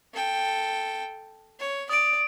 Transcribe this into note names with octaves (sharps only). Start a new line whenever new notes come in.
A4 G5
C#5
D5 D#6 D7